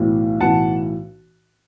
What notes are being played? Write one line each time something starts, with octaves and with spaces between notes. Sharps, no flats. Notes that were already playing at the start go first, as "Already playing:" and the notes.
Already playing: B1 A2 E3
B1 A2 E3 F#5 A5